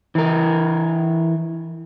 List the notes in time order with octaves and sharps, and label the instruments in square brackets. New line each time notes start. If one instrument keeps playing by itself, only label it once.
[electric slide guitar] E3 A#4